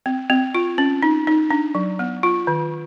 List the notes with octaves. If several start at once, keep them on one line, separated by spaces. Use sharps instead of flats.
C4
C4
F4
C#4
D#4
D#4
D4
F#3
B3
F4
D#3